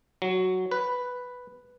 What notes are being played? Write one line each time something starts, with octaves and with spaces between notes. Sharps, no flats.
F#3
B4